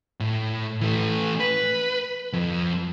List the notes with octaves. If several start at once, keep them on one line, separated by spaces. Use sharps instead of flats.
A2
E3 A3
B4
F2